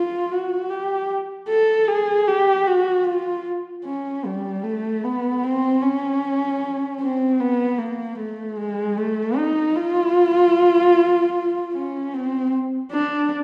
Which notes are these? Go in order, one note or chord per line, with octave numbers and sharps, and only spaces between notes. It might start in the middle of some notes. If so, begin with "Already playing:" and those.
Already playing: F4
F#4
G4
A4
G#4
G4
F#4
F4
C#4
G3
A3
B3
C4
C#4
C4
B3
A#3
A3
G#3
A3
D#4
F4
C#4
C4
D4